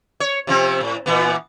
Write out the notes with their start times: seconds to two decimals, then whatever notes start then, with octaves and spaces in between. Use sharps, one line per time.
0.20 C#5
0.47 C3 F3 C4
0.80 A2
1.06 A#2 E3 B3